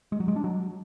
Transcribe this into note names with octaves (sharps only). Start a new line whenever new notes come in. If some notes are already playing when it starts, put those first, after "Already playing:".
G#3
F#3
G#3
D4
F#3